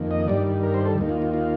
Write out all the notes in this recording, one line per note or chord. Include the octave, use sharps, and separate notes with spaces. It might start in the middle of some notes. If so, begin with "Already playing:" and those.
Already playing: F2 D#3 A#3
D#5
G2 D#3 G3 D5
A#4
C5
A4
D#2 D#3 A#3
F4
F4
F4